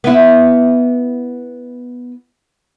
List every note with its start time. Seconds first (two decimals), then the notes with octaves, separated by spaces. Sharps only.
0.04 B3 E4